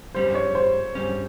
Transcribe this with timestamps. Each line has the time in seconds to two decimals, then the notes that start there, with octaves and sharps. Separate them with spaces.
0.15 G2 G3 C#4 C5
0.35 C#5
0.55 C5
0.95 G2 G3 C#4 C5